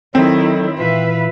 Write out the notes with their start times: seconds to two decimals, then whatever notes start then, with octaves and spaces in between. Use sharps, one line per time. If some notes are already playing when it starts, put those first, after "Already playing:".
0.15 D#3 F#3 C4 E4 A4
0.79 A#2 E3 E4 B4 E5 F5